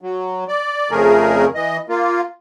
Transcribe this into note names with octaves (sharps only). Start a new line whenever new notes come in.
F#3
D5
F2 C#3 A3 G#4 A#4
E3 D#5
A#3 F4